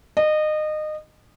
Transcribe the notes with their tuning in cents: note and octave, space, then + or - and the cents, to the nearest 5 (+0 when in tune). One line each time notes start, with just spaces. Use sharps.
D#5 -25